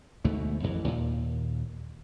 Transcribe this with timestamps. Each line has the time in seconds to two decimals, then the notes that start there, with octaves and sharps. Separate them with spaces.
0.25 D2 G#2 B2 A3
0.63 A1 F2 E3
0.84 D#2 A#2